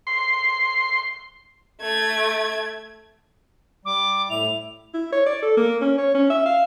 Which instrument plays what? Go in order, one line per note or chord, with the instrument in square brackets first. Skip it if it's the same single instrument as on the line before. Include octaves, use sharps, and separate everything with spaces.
[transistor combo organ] C6
[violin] A3 G#6
[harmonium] G3 [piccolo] D6
[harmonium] A2 E4 [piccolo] F7
[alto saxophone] E4
C#5
D5
A4
A#3
C#4
C#5
C#4
E5
F5